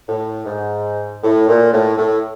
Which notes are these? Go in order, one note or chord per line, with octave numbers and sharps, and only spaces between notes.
A2
G#2
A2
A#2
A2
A2